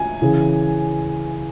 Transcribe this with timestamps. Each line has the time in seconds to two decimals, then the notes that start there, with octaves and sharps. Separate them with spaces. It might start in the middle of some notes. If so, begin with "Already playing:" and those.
Already playing: G#5
0.22 C#3 E3